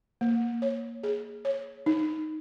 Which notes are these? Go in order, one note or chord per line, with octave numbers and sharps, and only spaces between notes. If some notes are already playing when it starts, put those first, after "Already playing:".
A#3
C#5
G#4
C#5
D#4